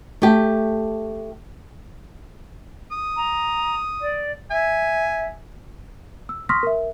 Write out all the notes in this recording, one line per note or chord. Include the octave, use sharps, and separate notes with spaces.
A3 G4
D#6
A#5
D5
E5 G#5
E6
C6 C#6 D#6 F6 A#6 B6
A#4 E5